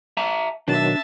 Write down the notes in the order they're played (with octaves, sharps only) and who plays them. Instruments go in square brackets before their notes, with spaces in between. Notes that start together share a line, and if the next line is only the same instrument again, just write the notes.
[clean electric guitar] E5 A5 A#5
[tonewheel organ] B2 D#3 F#3 [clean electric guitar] D4 [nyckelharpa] E5 A5